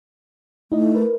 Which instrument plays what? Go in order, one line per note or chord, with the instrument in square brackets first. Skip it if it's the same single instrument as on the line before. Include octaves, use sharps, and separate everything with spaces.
[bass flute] A3 [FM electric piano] D#4 E4 D#5
[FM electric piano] A#4 B4